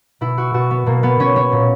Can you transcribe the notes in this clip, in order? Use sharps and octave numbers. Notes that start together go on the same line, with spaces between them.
B2 E4
F#4
B2 F#4
B3
B2 A#3
B3
B2 C#4
C#4
A#2